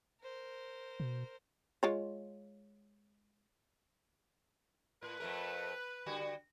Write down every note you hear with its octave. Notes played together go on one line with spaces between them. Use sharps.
A#4 C5
B2
G#3 F4 C#5
A2 B4
F2 A3 A#4
D3 G3 F#4